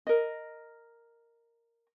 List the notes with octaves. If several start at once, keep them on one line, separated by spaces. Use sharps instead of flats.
A#4 D#5